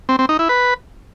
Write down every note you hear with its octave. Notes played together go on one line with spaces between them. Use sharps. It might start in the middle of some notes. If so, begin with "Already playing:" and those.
C4
C4
D#4
E4
B4